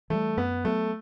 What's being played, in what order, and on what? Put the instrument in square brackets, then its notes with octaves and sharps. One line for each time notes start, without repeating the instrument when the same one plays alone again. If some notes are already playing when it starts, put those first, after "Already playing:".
[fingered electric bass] E3 G3 [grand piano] A3
[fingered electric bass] F#2 [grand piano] B3
[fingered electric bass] F#3 B3 [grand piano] A3